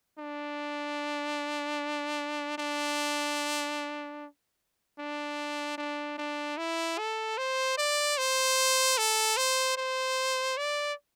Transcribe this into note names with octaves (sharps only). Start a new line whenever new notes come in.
D4
D4
D4
D4
D4
E4
A4
C5
D5
C5
A4
C5
C5
D5